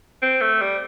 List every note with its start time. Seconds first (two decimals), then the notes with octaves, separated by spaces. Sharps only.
0.22 C4
0.41 A3
0.62 G3